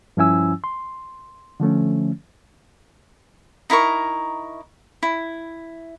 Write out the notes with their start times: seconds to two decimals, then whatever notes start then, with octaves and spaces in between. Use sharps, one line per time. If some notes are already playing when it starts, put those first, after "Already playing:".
0.17 G2 F3 C#4 E4 G#5 E6
0.64 C6
1.60 D3 F3 A3 C#4
3.70 D#4 E4 A#4 C#6
5.03 E4